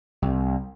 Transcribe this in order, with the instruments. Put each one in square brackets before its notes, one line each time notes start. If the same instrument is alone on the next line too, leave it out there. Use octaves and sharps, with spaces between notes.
[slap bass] C2